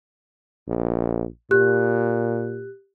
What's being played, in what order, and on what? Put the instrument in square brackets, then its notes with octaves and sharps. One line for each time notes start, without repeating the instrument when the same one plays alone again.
[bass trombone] A#1
[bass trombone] A#2 [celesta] G4 F#6